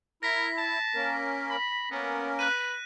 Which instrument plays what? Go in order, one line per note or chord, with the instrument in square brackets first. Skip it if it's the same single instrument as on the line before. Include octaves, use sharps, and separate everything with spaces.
[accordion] E4 [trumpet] A#4 [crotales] A#6 B6
[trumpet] A5
[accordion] A#3 C#4 A#4
[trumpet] B5
[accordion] A#3 C#4 A#4 [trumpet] B3
[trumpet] B4 [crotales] F#6 D#7